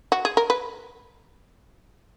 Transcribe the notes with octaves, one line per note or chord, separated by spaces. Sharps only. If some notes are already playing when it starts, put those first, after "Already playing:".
F#4
G#4
A#4
B4